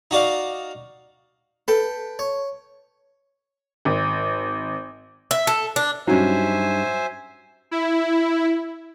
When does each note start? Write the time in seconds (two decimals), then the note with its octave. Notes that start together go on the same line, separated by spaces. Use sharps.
0.11 D#4 F#4 D5 F5
1.68 A4 B4 G5
2.19 C#5
3.85 G#1
5.31 E5
5.47 A4
5.76 D4
6.07 G2 F#3 C#4 D#4 C5 E5 G#5
7.71 E4